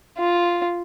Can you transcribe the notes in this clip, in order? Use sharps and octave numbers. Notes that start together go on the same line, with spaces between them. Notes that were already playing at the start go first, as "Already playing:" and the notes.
F4